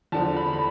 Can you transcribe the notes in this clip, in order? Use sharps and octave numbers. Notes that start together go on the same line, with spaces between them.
E2 D3 F3 A5
B5
B5